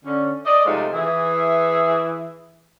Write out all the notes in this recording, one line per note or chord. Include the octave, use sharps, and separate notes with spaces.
D3 C#4
D5 D#5
C3 F3 G#3 A3 D#4 G#4
E3 G#4 E5